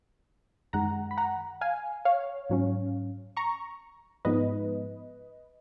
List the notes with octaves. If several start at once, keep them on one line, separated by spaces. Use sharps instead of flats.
F#2 D#3 G#3 F#5 A#5
B5
F#5 A#5
F5 G#5
C#5 F5
G#2 F#3 C#4
A#5 C#6
G#2 F3 G#3 B3 D#4 B4 D#5